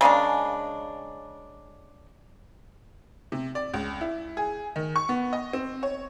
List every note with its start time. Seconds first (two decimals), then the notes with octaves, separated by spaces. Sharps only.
0.01 C#3 G#3 A#3 D4
3.32 C3
3.55 D5
3.74 C#2
4.01 E4
4.37 G#4
4.76 D#3
4.96 C#6
5.09 B3
5.33 D#5
5.53 C4
5.83 C#5